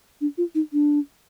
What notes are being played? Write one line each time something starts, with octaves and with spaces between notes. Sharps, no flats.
D4
F4
D#4
D4